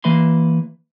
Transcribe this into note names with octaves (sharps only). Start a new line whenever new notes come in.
E3 A#3 B4 E5 B5 C6